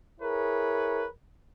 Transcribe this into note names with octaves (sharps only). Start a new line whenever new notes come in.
E4 G#4 A#4 B4 C#5